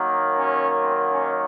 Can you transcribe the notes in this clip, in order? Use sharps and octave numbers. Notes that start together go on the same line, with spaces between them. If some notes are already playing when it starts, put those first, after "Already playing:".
Already playing: D#3 F#3 A#3
C#4
C4
C#4